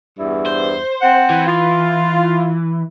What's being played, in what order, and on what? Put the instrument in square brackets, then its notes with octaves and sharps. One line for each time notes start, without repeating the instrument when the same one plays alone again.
[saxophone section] E2 G2 E4
[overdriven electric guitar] C5
[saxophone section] C4 F#5
[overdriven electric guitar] E3
[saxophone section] F4